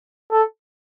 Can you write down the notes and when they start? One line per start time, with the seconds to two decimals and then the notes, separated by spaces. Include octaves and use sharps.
0.32 A4